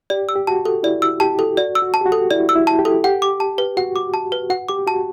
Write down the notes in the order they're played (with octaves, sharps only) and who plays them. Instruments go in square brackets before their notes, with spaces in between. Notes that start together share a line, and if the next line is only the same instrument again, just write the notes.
[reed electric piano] G4 [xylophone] D5
[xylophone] E6
[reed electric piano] G4
[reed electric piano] F#4 [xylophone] A5
[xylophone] A4
[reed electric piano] E4 [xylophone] D5
[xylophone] E6
[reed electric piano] G4 [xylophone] A5
[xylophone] A4
[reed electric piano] F#4 [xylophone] D5
[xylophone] E6
[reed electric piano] F#4
[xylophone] A5
[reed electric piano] G4
F#4
[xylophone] A4
[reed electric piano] E4 [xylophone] D5
[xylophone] E6
[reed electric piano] E4
[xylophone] A5
[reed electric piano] G4
[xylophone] A4
[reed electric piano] G4 [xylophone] F#5
[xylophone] D6
A5
B4
[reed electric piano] F#4 [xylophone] F#5
[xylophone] D6
A5
B4
[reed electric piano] F#4 [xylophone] F#5
[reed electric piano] G4 [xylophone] D6
[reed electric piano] F#4 [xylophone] A5